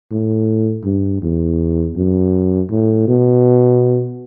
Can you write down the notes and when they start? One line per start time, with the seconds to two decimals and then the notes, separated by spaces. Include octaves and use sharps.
0.11 A2
0.85 G2
1.22 E2
1.96 F#2
2.70 A2
3.08 B2